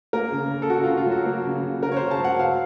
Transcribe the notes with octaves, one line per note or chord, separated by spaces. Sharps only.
A#3 A#4
C#3
C#3
A4
C#3 F#4
C#3 F4
F4
F#3
F#4
A#3
C#3
C#3
C#3 A#4
C#5
C5
C#3
A5
F#3 F#5
F#3 F5